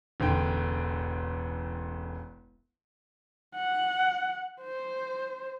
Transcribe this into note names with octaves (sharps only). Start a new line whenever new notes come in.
E1 A1 D3 G5
F#5
C5